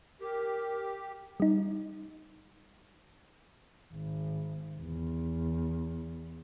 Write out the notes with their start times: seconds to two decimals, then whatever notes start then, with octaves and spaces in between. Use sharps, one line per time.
0.21 G4 A#4
1.40 G3 D#4
3.94 G#1
4.80 E2